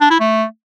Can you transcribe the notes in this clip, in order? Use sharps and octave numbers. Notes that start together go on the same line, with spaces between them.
D4
E4
A3